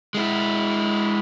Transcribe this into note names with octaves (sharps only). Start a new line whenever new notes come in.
G#3 E4